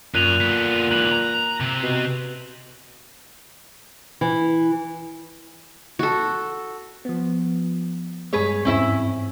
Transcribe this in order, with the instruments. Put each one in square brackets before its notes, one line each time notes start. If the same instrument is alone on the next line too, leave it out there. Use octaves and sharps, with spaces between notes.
[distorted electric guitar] F#2 [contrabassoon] A#2 [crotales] F#6 D#7 F7
[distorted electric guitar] D3 B3
[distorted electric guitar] G#2 E3 [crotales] F#6 F#7
[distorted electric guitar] A#5
C3 C4
[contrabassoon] B2
[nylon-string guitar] E3
[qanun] F#4 A4
[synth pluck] F3 B3
[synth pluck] G2 G#3 [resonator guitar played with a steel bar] G#4 B4 C#5
[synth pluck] E2 G#2 C4 [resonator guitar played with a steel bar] C#4 E4 E5